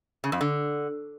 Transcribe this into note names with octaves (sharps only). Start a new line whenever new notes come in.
C#3
F2
D3